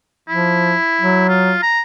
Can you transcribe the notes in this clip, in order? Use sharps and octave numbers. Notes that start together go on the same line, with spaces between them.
F3 E4
F#3
F4
A#5